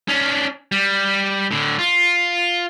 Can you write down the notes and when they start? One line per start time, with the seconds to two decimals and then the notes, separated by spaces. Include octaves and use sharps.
0.08 C#4 D4
0.72 G3
1.51 A2 D3
1.79 F4